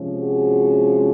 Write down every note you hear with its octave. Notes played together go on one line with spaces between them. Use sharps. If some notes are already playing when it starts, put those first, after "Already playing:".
Already playing: C3 F3 G#3 C#4
F#4 G#4